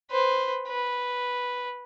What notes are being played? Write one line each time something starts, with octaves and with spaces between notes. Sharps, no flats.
B4 C5
B4